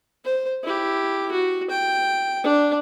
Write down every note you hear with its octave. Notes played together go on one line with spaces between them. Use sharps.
C5
E4 G4
F#4
G5
D4